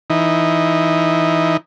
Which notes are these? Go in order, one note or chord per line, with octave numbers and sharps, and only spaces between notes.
E3 D#4